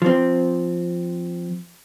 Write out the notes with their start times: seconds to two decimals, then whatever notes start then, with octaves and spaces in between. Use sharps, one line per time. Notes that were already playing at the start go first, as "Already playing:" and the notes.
0.02 F3 C4